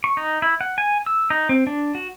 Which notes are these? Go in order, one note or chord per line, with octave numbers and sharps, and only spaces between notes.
C#6
D#4
E4
F#5
G#5
E6
D#4
C4
D4
F#4